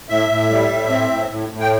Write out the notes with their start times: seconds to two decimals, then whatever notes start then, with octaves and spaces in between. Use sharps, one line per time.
0.09 A2 E5
0.29 A2
0.49 G3
0.69 A2
0.89 C4
1.09 A2
1.29 A2
1.49 A2
1.61 G5